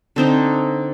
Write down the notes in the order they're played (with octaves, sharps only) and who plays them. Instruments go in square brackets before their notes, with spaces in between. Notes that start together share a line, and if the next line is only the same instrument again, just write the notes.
[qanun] D3 C4 D#4